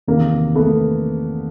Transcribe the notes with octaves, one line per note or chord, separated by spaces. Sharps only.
E2 C3 D#3 A#3
A3 B3